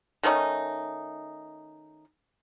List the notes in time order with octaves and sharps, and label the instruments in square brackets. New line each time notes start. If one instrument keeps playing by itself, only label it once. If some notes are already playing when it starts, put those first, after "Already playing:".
[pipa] D#3 A3 C#4 D#4